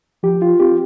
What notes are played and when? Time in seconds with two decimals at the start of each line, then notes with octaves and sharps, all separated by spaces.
0.23 F3 G4
0.42 F4
0.60 C4 F4 G4